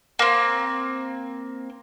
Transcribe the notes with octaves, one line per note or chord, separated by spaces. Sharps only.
A#3 C4